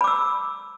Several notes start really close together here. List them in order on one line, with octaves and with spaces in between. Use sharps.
B5 D6 E6